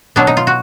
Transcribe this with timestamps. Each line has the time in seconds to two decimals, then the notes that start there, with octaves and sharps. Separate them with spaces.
0.16 B2 F#3 B3 D4
0.27 D#4
0.37 F4
0.47 F#4